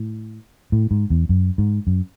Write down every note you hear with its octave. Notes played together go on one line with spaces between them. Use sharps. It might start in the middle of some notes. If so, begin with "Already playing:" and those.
Already playing: A2
A2
G#2
E2
F#2
G#2
F#2